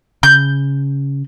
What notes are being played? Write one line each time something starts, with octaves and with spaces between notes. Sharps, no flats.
C#3 G6